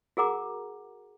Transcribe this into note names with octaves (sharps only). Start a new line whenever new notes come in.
F#4 G#4 A#4 F#5 A#5 D6